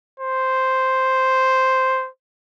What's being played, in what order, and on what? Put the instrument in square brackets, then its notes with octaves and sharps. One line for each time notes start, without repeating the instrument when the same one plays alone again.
[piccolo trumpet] C5